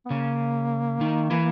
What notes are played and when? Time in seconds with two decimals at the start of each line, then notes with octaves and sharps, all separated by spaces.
0.06 B3
0.10 C#3 A#3 C#4
1.01 D#3 D#4
1.31 E3 E4